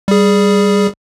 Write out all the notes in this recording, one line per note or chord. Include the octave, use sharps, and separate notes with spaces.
G3 G#4